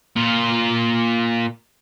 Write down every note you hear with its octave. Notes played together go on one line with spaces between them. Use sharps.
A#2 F4